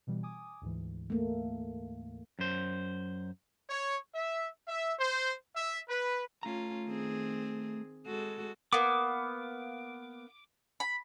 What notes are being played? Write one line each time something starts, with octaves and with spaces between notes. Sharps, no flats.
B2 E3 G3
G#5 D6 D#6
D2 G#2 E3
A3 A#3
F#2 C5
C#5
E5
E5
C5
E5
B4
A3 C#4 F4 A#5
D#3 C4 G#4
G#3 F#4 A4
A#3 B3 D6
B5